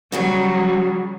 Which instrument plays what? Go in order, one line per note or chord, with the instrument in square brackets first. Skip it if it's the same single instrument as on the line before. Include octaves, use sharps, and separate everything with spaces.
[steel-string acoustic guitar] C#3 F#4 G#4 [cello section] F#3 G3